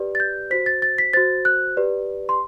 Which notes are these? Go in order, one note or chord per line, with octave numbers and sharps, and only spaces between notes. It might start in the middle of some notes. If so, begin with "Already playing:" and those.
Already playing: G4 B4 D5
A6
G6
F#4 C5 B6
A6
A6
B6
F#4 C5 A6
F#6
G4 B4 D5
C6